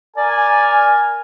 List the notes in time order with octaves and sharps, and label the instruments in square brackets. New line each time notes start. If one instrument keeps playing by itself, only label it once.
[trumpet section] A#4 G#5 [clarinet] D5